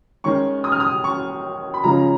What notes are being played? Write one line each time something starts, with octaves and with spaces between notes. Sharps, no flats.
D#3 G#3 C#4 C#6
D#6
F6
D#6
C#6
B5
C#3 F3 G#3 C#4 F4 A#5